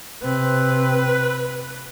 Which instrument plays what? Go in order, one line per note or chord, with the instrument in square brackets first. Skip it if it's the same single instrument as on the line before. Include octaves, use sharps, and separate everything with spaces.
[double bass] C3 C4 [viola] B4